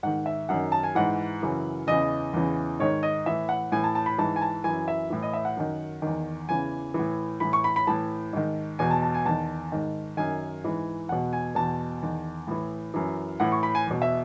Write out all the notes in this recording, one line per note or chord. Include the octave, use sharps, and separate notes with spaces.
G#2 D#3 F#5
E5
F#2 D#3 F#5
A5
G#5
G#2 E3 F#5
F#2 C#3 E3
E2 C#3 E3 D#5
E2 C#3 E3
G#2 D#3 C#5
D#5
A2 E3 E5
F#5
A2 E3 G#5
A5
A5
B5
G#2 E3 A5
G#5
A5
F#2 E3 G#5
E5
A2 E3
D#5
E5
F#5
F#2 D#3
E2 D#3
E2 C#3 E3 G#5
A2 E3
A2 E3 B5
C#6
B5
B5
A2 E3 A5
G#2 D#3
E2 B2 G#5
A5
A5
G#5
E2 D#3 A5
G#2 D#3
F#2 D#3 G#5
G#2 E3
E2 B2 F#5
G#5
E2 B2 A5
E2 D#3
A2 E3
F#2 E3
A2 E3 F#5
C#6
B5
G#5
E2 B2
E5